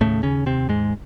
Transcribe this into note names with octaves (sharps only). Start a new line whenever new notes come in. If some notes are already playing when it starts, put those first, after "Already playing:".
D#2 A2 C#3 A3
C#3 C#4
C3 C4
G#2 G#3